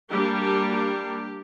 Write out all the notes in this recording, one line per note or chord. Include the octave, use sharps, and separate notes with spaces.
G3 A#3 D4 G4
G4
G4